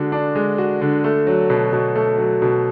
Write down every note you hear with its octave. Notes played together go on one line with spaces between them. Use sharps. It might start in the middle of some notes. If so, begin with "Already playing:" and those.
Already playing: D3 G#3 D4 F#4
D4
G#3
F#4
D3
A3
F#3
B2
B2
A3
F#3
B2